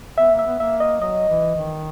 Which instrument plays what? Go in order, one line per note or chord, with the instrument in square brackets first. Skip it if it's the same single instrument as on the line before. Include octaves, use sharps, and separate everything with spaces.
[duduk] B3 [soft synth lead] E5
[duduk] A#3
[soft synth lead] E5
[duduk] B3
[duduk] A#3 [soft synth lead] E5
[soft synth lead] D#5
[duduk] F#3 [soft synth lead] D#5
[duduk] E3
D#3